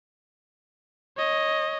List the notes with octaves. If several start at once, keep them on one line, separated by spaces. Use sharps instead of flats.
C#5 D#5